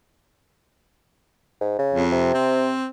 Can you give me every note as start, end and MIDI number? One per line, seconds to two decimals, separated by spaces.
1.61 1.79 44
1.79 2.04 49
1.93 2.32 41
2.12 2.74 48
2.34 2.86 60